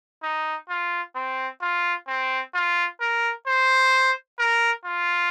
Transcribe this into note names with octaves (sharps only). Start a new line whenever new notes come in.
D#4
F4
C4
F4
C4
F4
A#4
C5
A#4
F4